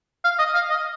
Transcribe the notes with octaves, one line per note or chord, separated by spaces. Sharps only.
F5
D#5
F5
D#5